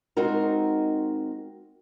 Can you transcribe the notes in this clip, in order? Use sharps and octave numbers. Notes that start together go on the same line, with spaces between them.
G#3 C4 D#4 F#4 A#4